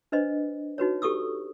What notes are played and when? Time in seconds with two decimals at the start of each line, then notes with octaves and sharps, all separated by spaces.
0.12 D4 B4 C5 D#5
0.78 D#4 F#4 B4 C#5
1.02 G4 A4 C#6 D#6 E6